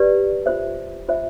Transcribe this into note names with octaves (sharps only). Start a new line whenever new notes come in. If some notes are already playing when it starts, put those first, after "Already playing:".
Already playing: G4 B4 D5
F4 C5 E5
F4 C5 E5